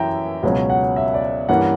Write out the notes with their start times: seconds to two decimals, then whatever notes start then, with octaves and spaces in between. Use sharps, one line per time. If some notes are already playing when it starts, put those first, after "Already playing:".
Already playing: F#2 E3 C#4 E5 G5 A#5
0.43 C#2 B2 F#3 C#4
0.70 F#5
0.96 E5
1.14 D5
1.49 G2 E3 A#3 C#4 F#5